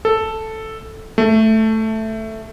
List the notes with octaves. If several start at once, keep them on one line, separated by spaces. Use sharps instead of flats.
A4
A3